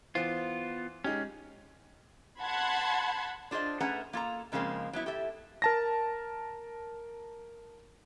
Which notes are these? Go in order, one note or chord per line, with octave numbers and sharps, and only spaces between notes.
E3 B3 F4 C5
G#3 C#4 D#4 G4
F#5 A5 B5 C6 G#6
D4 F4 G#4 C5 D#5
A3 C#4 G#4 B4 F#5 A#5
A#3 F4 A4 A#5
G#2 C#3 F3 G#3 A#3 C4
F#3 B3 E4
G4 A4 E5
A#4 A5 A#6